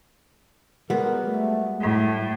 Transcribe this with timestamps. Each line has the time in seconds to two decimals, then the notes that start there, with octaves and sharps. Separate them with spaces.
0.90 G3 G#3 B3 F#4 A#4
1.24 A3
1.81 A2 A3